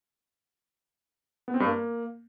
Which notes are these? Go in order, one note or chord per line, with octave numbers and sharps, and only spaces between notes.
B3
C4
G2
A#3